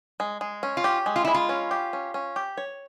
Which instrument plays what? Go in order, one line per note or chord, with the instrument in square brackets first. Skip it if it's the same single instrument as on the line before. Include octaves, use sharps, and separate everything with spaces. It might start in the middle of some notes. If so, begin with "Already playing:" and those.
[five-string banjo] G#3
G#3
C#4
[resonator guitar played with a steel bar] F4
[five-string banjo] G4
G#3
[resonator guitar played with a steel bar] F4
[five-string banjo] G#3 [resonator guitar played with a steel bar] E4
[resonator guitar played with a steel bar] F4
[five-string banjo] C#4
G4
C#4
C#4
G4
C#5